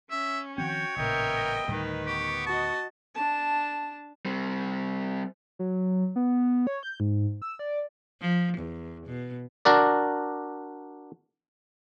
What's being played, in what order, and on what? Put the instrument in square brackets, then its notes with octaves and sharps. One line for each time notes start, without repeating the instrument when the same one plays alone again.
[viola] C#4 [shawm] E5
[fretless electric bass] D#3 F3 C4 [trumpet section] F#4 G5 [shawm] C#5
[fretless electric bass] A1 A#2 C#3 [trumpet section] B3 D#5 G5 [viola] A#4 E5
[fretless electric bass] D2 A2 G3 [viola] D#3 B4
[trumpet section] B3 C#6 [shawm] G4
[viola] F#4 D#5 [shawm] A5
[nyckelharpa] D4 A5
[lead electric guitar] G3 C4
[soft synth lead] F#3
B3
C#5
G6
G#2
E6
D5
[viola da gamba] F3
E2
B2
[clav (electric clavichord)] D4 F#4 A#4 D5